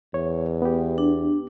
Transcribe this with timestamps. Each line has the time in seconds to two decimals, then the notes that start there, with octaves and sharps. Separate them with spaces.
0.14 E2 C#5
0.62 B3 G4
0.98 D4